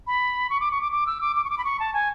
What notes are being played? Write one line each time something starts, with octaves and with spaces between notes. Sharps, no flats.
B5
C#6
D6
C#6
D6
D6
E6
D6
D6
C#6
D6
B5
C#6
A5
G#5